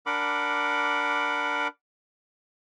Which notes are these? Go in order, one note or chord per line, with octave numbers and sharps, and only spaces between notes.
D4 A#4 F#5 B5 D6